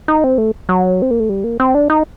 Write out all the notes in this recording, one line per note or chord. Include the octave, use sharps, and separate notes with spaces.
D#4
C4
A3
F#3
C4
A#3
A3
G3
A#3
C4
D4
D#4